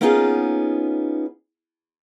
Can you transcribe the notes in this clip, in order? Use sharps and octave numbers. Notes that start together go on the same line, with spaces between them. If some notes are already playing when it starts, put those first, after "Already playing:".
A#3 B3 C#4 D#4 F4 G#4